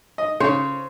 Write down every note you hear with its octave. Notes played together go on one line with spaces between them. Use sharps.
D#5
C#3 C5 C#5